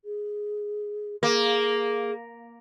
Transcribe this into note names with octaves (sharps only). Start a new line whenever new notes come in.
G#4
A#3 G#4